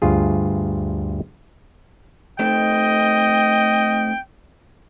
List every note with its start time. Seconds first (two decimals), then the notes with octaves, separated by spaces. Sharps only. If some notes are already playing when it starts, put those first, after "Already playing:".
0.02 D2 G2 F4 G#4
2.39 A3 C4 D#4 D#5 G5